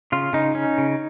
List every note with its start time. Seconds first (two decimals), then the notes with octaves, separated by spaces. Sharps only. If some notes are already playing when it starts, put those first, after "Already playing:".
0.12 C#3 F4
0.33 C#3 D#4
0.55 C#4
0.78 C#3